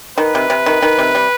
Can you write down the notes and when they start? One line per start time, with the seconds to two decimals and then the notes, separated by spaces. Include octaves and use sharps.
0.18 D#3 B4
0.35 C3
0.50 C3
0.66 D#3
0.82 D#3
0.98 C3
1.15 G3